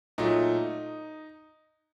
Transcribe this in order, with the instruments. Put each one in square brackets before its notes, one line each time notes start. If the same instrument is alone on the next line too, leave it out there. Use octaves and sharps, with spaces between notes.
[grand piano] A#2 F#3 A3 D#4